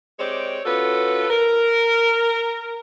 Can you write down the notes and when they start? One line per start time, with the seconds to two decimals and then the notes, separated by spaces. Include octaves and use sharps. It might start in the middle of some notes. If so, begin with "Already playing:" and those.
0.20 G#3 C4 G4 C#5 D5
0.66 C#4 F4 F#4 A4 B4
1.30 A#4